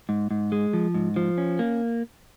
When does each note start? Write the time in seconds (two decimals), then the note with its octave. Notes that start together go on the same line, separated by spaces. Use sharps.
0.09 G#2
0.31 G#2
0.52 G#3
0.73 F3
0.94 G#2
1.16 F3
1.38 C#4
1.59 A#3